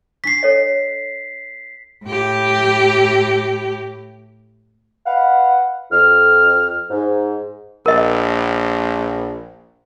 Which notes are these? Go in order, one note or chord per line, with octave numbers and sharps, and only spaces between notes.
D4 C#6 B6 C7
A4 C#5 D#5
A2 G4
B4 D#5 F5 F#5
F2 F6
G#2
A#1 A#4 D#5